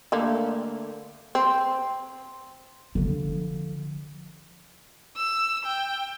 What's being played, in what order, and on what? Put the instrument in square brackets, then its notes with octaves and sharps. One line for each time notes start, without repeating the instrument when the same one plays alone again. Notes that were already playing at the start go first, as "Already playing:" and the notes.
[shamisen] D3 A3 A#3
C4
[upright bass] D3 F3
[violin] E6
G5